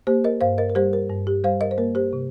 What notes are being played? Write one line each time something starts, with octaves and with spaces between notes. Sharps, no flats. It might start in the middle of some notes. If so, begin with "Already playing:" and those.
A#3 G4 C5
A#4 D#5
G2 C5 F5
A#4 D#5
A#4
G3 G4 C5
A#4
G2
G4
G3 C5 F5
A#4 D#5
C5
A#3 A#4
G4 C5
C3